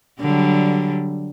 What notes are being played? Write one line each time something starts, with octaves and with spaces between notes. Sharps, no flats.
D3 F#3 G3